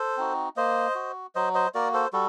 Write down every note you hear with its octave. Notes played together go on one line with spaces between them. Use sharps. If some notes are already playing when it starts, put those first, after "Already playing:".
Already playing: A4 C5
C4 D#4 F#4
A#3 C5 D#5
F#4
F#3 C5 D#5
C5 D#5
A#3 F#4 A#4 D5
A4 C5
G3 F#4 A4